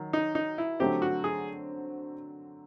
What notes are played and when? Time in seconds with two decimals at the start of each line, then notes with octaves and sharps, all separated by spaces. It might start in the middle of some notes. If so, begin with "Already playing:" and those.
Already playing: D#3 F#3
0.13 D#4
0.35 D#4
0.58 E4
0.80 D3 F#3 A3 C4 G4
1.02 F#4
1.24 G#4